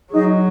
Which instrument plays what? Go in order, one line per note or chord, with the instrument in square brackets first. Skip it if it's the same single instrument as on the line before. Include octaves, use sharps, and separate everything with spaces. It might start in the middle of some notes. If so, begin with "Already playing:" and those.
[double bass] F#3 [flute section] D#4 G#4 D#5